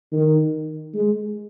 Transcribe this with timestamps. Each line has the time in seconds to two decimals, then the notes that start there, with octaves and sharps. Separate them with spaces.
0.13 D#3
0.94 G#3